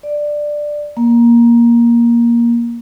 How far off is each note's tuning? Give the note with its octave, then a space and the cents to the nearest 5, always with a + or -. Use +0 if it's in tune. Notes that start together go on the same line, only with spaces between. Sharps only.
D5 +10
A#3 +15